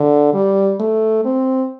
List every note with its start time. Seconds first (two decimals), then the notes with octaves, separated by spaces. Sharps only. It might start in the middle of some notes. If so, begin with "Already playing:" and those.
Already playing: D3
0.34 G3
0.80 A3
1.25 C4